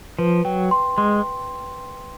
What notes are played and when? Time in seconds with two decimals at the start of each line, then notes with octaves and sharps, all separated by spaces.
0.19 F3 B4
0.45 F#3 G5
0.71 C6
0.98 G#3 C6